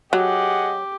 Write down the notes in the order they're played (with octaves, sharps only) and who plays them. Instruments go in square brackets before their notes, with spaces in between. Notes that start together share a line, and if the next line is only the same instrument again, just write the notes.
[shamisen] F#3 [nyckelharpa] G4 [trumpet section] G#4 D#5 F#5